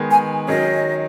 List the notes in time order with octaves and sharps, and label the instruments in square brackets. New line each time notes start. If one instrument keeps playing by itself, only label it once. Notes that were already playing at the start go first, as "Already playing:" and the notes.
Already playing: [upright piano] D#3 G#3 B3
[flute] G#5
[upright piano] D#3 F#3 C#4 G#4 [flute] D#5